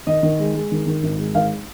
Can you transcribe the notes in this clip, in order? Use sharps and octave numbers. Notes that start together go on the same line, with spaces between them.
D#3 D#5
D#3
G#3
G#3
D#3
D#3
G#1
G#3
G#1 F5